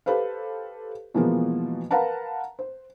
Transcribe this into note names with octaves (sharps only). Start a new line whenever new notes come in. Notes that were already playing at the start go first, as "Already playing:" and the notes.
G4 A4 B4 C5 F5
B2 E3 F3 G#3 A#3 B3
A#4 B4 F5 F#5 A5 A#5
C5